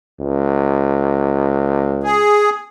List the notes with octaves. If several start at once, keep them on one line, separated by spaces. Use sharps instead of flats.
C#2
G#4